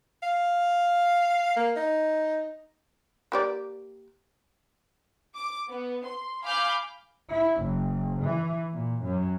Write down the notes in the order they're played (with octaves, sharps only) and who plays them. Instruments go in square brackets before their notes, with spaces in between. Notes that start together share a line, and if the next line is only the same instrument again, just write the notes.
[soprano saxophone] F5
A#3
D#4
[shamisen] A#3 G4 D5
[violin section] D6
B3
C6
F5 G#5 B5 D6 F6 G6
[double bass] E4
F#1
E3
A#2
F#2